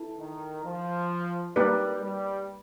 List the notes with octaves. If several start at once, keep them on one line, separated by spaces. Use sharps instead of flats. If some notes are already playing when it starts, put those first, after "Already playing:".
Already playing: E4 A4
D#3
F3
G3 A#3 D#4 G4 B4 D5
G3